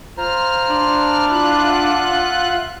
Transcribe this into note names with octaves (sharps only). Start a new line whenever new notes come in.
F4 C5 A#5 F6
D4
E4 F4 E5 F#6
E5 F#5